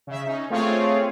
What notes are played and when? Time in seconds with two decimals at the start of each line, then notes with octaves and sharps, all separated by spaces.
0.07 C#3 E5
0.26 C#4 D#4
0.50 A3 C4 F4 G#4 C#5 F5